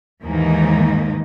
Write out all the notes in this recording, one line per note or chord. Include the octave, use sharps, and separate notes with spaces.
D#2 G#2 D#3 E3 A#3 D#4